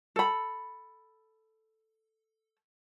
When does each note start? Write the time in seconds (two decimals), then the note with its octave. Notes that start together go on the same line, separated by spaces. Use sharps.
0.16 A4 B5